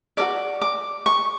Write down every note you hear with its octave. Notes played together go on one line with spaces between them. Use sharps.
F#4 A#4 D5 D6
D6
C#6